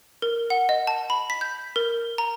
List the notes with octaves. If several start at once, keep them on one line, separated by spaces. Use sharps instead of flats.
A#4
F#5
D#5
A5
B5
B6
G6
A#4
A#5